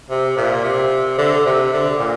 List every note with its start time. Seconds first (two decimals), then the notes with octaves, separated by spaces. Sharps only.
0.10 C3
0.37 A#2
0.64 C3
1.18 D3
1.46 C3
1.73 D3
1.99 A#2